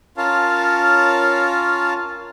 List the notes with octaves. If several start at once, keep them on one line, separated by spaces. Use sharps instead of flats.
C#4 F4 A#4 C#5 F5 A5